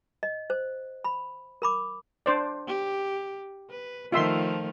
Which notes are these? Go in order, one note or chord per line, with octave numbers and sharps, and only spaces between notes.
D#5
C5
B5
A#4 B5 D6
D4 C5 D5
G4
B4
D#3 F3 A3 F4 E5 C6